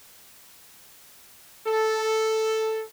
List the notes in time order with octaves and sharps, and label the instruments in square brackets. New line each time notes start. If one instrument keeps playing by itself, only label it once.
[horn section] A4